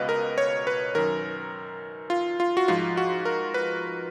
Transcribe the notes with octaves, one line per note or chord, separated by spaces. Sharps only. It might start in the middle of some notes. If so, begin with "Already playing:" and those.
Already playing: C#2 B2 B4 D#5 F5
A#4
C#5
B4
F#2 D#3 A#4
F4
F4
F#4
G#2 F3 F4
F#4
A#4
B4